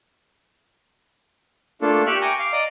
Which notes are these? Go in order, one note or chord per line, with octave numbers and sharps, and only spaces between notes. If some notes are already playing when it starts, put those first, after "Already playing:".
A3 A#3 D4 F4 A4
G4 E5 G5 C#6 F6 F#6
G5 G#5 A#5 C#6 D6 G6
F5 D6
D5 D#5 A#5 D6